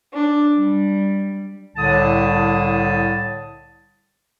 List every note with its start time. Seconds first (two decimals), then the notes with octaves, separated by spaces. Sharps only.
0.13 D4
0.58 G3
1.76 C2 A2 D3 A5 D#6